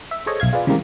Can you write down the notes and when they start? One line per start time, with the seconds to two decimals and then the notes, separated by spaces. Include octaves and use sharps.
0.11 E5
0.26 G#4 A4 C5 C#5 D#5
0.40 B1 E5 F5 G#6
0.53 F4 G#4 B4 D5
0.67 C#3 E3 G3 G#3 A#3 C4